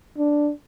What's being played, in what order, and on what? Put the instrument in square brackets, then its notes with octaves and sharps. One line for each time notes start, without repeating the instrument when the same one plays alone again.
[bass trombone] D4